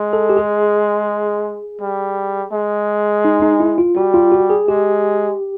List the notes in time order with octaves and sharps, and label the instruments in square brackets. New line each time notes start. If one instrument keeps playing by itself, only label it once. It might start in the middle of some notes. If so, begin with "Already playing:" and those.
Already playing: [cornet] G#3
[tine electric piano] A4
G4
G#4
[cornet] G3
G#3
[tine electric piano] D#4
D#4
E4
F4
[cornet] G3 [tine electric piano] F#4
[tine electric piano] F4
F#4
G#4
[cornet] G#3 [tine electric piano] G4